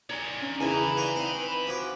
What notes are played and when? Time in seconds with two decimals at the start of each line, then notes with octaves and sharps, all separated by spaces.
0.10 D#4 C#5 D5 G#5
0.42 C#4
0.61 E2 C#3 D#4 E4 A#4 B4 G#5 B5
0.97 F4 D5 A#5
1.16 C4 D#4 C6
1.67 F3 F#4 D6